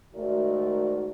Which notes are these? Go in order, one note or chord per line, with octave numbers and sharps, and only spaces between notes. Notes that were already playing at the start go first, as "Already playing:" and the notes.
G#2 D#3 A3 F#4 A#4 D5